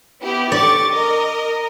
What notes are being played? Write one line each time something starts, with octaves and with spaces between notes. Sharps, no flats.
B3 E4 G4
G4 D5 C#6 A6
A#4 D#5